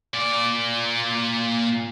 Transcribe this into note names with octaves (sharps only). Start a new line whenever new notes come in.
A#2 D5